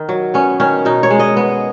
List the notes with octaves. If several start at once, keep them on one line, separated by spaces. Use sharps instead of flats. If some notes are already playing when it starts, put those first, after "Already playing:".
Already playing: D#3
F#3
B3 C#4
D#3 C#4
B2 D#4
C#5
G#3
D#5
B3